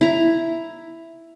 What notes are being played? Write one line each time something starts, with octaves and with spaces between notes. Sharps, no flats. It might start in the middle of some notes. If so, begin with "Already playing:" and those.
E4 A#5